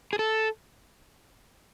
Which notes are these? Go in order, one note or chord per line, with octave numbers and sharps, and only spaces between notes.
G#4
A4